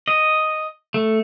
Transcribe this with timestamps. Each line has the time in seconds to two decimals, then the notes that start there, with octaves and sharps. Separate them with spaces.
0.08 D#5
0.94 A3